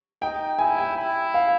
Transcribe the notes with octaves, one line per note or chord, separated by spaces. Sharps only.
D#4 G5
E4 G#5
G5
E4
F5